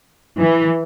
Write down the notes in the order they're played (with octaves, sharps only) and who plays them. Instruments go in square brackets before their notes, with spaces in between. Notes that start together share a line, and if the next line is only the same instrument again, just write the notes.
[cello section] E3